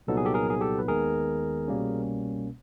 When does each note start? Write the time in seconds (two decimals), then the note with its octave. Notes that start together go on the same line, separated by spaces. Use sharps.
0.07 C2 A#2 F#3 B3 D#4 A4
0.17 G#4
0.25 G4 A4
0.34 G#4 A#4
0.50 G#4
0.61 G4 A4
0.79 B4
0.88 D#2 D#3 G#3 B3 G#4 A#4
1.68 C2 B2 G3 A#3 C#4